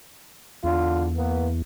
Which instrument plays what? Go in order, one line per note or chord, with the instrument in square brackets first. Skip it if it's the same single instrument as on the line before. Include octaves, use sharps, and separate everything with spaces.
[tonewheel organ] E2 [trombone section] D3 F4
[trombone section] A#3 B3